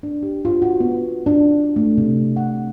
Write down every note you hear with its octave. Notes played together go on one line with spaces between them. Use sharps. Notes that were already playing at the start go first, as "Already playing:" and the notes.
D4
G4
F4
F#4
B3
D4
A3
C3
F#5